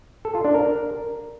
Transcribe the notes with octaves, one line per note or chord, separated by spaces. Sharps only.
A4
F4
D4
A#4